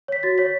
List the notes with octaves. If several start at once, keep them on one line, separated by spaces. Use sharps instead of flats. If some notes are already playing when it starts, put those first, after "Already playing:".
C#5 B6
F#4 A6
C#5 B6